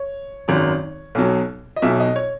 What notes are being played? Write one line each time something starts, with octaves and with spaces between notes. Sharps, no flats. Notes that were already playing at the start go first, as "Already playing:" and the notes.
Already playing: C#5
G#1 F#2 D#3 F#3
B1 B2 F#3
D#5
B1 B2 F#3 E5
D#5
C#5